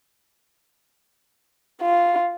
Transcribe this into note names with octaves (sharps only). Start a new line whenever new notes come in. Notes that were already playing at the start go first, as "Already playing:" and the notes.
F4